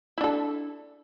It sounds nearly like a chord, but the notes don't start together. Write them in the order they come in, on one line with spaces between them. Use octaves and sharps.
E4 D4 A4